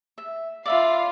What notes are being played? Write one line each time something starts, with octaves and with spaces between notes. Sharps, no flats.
E5
F4 D5 E5 F5 B5